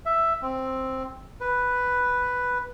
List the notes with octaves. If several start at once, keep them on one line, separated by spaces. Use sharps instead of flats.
E5
C4
B4